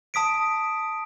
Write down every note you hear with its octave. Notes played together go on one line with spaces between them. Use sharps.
A5 D#6 B6 D7